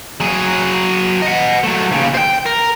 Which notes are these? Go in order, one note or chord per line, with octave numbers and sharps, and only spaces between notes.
F#3 G#4
D#5 F#5
F#3 A3
D#2 C#3
C5 G5
A#4